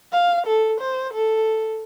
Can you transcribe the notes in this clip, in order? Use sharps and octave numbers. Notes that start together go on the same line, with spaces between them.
F5
A4
C5
A4